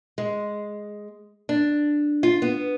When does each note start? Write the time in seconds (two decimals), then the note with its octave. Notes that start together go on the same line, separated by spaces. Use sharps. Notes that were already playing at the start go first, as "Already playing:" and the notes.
0.18 G#3
1.49 D4
2.23 F4
2.42 B3